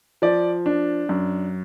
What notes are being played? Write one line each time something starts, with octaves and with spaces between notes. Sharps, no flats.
F3 D5
D4
F#2